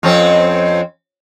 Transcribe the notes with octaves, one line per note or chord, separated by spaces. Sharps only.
F2 C4 C#4